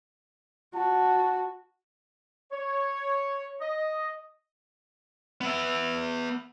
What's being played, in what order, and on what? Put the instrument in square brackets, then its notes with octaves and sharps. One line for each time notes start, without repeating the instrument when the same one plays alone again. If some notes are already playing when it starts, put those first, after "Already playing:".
[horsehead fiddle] F#4 [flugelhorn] A5
[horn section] C#5
D#5
[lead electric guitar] B3 E5